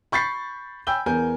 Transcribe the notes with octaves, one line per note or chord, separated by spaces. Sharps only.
B5 C#6 G6 A6 B6 C7
G5 G#5 B5 E6 G6 G7
E2 B3 A#4 G#5 G6